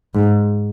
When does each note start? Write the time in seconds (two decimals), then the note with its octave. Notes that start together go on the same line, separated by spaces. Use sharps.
0.15 G#2